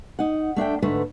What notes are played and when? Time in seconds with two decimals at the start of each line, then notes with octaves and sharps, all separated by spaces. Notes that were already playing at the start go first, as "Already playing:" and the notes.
0.19 D#4 F#5
0.56 A3 D4 E5 G5
0.82 D2 G#2 D3 A3 B4